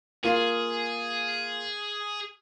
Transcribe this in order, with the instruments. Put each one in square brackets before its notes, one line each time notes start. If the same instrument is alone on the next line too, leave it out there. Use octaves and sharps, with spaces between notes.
[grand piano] A#3 F4 [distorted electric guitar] G#4